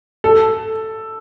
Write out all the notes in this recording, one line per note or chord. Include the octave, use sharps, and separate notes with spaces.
A4